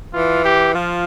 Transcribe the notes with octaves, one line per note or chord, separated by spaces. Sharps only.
E3 F4
G4
F3 F4